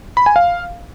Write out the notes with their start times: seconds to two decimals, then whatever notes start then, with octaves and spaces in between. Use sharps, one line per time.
0.17 B5
0.26 G#5
0.36 F5